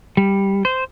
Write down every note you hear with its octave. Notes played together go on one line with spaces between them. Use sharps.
G3
C5